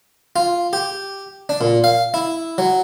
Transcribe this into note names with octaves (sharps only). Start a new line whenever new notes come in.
F4
G4
D4
A#2
F5
E4
F#3